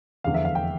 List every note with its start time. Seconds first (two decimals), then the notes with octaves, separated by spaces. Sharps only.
0.24 F1 E2 D3 F5
0.34 E5
0.45 F5
0.55 G5